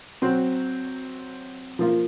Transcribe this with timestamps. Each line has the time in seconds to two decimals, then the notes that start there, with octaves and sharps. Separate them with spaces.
0.22 F#3 C4 F#4 C5
1.79 F3 A#3 F4